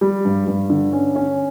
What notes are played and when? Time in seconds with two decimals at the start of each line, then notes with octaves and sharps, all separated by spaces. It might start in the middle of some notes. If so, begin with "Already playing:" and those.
0.01 G3
0.25 G2
0.47 G2
0.70 D3
0.93 C#4
1.16 C#4